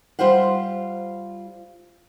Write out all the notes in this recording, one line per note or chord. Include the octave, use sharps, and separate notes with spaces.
G3 F4 C5 F5 F#5